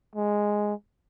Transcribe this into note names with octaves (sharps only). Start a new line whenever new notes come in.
G#3